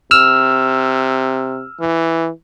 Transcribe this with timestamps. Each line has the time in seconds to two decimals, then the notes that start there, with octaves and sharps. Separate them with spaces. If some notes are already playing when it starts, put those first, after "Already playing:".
0.11 C3 E6 F6
1.80 E3